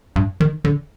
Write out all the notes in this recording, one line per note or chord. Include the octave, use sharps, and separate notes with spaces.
G2
D#3
D3